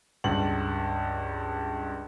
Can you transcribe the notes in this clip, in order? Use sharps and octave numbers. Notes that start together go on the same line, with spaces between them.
C#2 G2 F#7